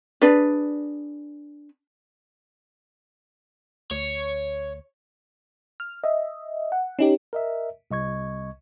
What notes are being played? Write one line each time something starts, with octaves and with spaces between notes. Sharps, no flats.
D4 G#4 B4 D5
D2 C#5
F6
D#5 E5
F#5
C#4 D#4 G4
A#4 D#5 E5
C2 D#5 C#6 G#6